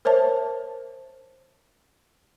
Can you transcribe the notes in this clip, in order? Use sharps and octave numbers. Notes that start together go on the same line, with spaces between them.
A#4 C5 C#5 E5 A5